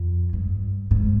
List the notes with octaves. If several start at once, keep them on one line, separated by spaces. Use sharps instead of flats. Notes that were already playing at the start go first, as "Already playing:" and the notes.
Already playing: F2
G2
G#2